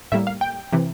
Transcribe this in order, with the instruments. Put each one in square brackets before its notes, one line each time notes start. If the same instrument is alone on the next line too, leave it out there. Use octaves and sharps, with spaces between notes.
[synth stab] A2 G3 A#3 E5
F5
G5
C3 E3